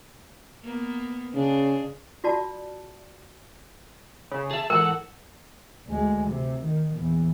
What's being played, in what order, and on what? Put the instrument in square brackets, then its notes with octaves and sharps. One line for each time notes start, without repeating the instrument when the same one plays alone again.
[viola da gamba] A#3 B3
[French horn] C#3 [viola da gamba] D4 G#4
[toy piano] F4 F#4 D5 A5
[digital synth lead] C#3
[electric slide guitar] G#4 E5 [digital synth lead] A5
[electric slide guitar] G#2 E3 A4 [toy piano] A#4 [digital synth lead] F#5
[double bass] D2 G#3
C3
D#3
A#1 E2